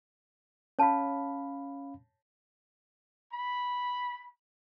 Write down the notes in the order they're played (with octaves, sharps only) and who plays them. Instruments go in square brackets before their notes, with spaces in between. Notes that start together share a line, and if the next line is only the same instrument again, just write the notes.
[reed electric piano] C#4 F5 B5 [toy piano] C#5 A5
[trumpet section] B5